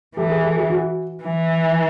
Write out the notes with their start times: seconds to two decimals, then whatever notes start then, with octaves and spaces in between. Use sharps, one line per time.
0.16 E3 G4 A4
0.30 G#4 A#4
0.43 G4 A4
0.56 F#4 G#4
0.70 F#4
1.23 E3